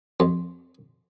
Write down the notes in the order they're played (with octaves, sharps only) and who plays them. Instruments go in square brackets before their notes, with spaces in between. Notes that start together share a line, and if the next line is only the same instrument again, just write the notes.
[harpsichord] F2